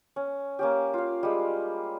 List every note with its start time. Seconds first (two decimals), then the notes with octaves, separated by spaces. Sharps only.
0.16 C#4
0.59 A#3 C#4 G4
0.94 F4 F5
1.23 G3 G#3